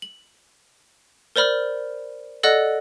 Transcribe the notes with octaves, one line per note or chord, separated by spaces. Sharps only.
F#7
A#4 C5 D5 B5 F6
A4 D5 D#5 F#5 F#6 A#6